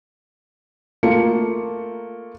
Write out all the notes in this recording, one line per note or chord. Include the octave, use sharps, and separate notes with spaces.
A3 A#3 F4 C#7